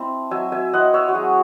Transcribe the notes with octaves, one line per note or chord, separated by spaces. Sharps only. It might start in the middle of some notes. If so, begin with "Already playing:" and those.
Already playing: C4 E4 A5
F#3 E5 G#5
E5 G#5
C4 E4 D#5 F#5
C#5 E5
F#4
F#3 G#4